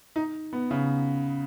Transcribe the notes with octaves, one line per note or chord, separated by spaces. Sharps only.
D#4
B3
C#3